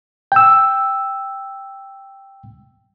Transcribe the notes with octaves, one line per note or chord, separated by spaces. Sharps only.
G5 E6